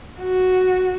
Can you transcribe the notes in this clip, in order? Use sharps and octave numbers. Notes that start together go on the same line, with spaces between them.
F#4